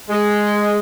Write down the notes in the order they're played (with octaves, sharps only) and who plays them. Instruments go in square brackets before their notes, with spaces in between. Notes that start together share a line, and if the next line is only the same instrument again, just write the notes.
[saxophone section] G#3